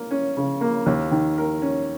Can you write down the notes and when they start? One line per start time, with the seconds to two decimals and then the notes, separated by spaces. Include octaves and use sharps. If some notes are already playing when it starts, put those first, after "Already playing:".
Already playing: A#3 A#4
0.11 C#4
0.37 C#3
0.61 A#3
0.86 D#2
1.11 D#3
1.38 A#4
1.62 C#4